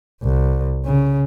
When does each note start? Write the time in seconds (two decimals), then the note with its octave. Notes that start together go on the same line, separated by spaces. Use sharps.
0.23 C2
0.85 C#3